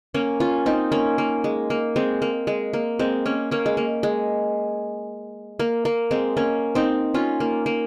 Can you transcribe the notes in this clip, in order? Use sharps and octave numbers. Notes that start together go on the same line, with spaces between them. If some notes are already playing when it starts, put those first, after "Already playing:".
A#3 C#4
C#4 F4
C4 D#4
A#3 C#4
A#3
G#3
A#3
G#3 C4
A#3
G#3
A#3
G#3 C4
A#3 C#4
A#3 C#4
G#3
A#3
G#3
A#3
A#3
G#3 C4
A#3 C#4
C4 D#4
C#4 F4
A#3
A#3